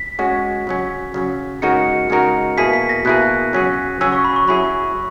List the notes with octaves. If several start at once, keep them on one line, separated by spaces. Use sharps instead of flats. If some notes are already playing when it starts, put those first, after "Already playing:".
Already playing: B6
G#3 C#4 F#4
C#3 F#3 C#4
C#3 F#3 C#4
C#3 G#3 D#4 F#4 A#4 C#7
C#3 G#3 D#4 F#4 A#4
B2 A#3 E4 G#4 B6
B6
A#6
B2 A#3 E4 G#4 F#6
C#3 F#3 C#4 G#4
C#3 F#3 C#4 G#4 E6
C#6
B5
C#6
F#3 C#4 E4 G#4 B5